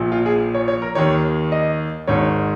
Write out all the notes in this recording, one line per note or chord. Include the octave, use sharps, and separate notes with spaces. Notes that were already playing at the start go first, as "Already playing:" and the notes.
Already playing: A#1 A#2 F3
F4
G#4
C#5
C#5
A#4
D#2 D#3 C#5
D#5
G#1 G#2 D#3 C#5